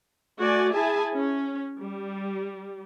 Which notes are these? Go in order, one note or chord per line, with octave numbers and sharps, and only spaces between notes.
A3 F#4 D5 G#5
E4 G#4 E5 G#5 A5
C#4
G3